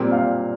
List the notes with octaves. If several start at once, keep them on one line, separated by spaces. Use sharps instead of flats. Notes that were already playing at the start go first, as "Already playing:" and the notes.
Already playing: A#2 G3 C4
F5